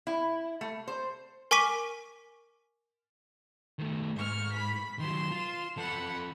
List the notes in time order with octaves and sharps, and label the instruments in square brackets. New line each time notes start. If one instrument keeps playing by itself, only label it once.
[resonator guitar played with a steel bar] E4
A3
C5
[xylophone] A#4 G#5 C#6 D6 B6 D#7
[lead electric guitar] D#3 A3
[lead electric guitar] G#2 [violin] C#6 F6
[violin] B5 B6
[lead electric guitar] D#3 F#3 [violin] C6 E7
[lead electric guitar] F4
[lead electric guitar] F3 A4 [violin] F#5 B5